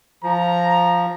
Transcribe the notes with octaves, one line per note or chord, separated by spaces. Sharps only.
F3 A#5